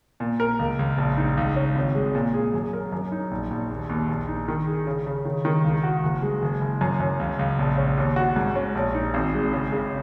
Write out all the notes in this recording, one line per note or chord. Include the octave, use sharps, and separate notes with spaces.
A#2
A#4
C#2
C#2
A#1
D#4
C#2
C#4
G#1
G#3
A#2
G#4
F#2
A#4
F#2
D#4
A#1
A#1
D#2
D#2
A#1
D#4
D#3
G#4
C#3
C#3
D#3
D#3
C#2
F#4
F#1
G#3
F#1
F#1
F#2
F#2
C#2
C#2
A#1
C#4
D#2
F#4
G#2
C#4
A#1
D#4
G#1
G#3
C#3
C#3